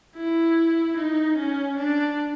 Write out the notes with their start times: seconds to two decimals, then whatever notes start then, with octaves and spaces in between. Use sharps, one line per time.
0.16 E4
0.97 D#4
1.37 C#4
1.77 D4